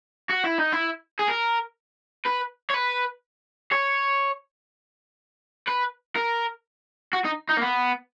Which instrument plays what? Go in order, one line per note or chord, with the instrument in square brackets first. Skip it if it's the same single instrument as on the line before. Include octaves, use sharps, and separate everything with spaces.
[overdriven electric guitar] F#4
E4
D#4
E4
G#4
A#4
B4
C#5
B4
C#5
B4
A#4
F#4
D#4
D#4
A#3
B3